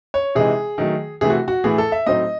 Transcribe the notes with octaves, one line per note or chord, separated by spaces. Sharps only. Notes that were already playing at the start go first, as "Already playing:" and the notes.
C#5
C3 E3 G#3 D#4 G#4
D#3 F#3 A3
C3 E3 A3 G#4
F#4
F#4
A2 E3 A3 G#4
A4
E5
A2 F#3 A3 C4 D#4 D#5